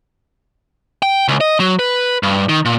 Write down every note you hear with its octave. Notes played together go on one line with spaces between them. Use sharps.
G5
C#2
D#5
F#3
B4
G2
D#3
A#2